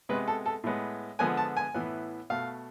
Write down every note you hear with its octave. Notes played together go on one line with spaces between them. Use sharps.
C3 G#3 B3 B4
A4
A4
A2 G#3 B3
D3 F3 G#3 B3 G#5
A5
G#5
A2 E3 B3
B2 A3 F5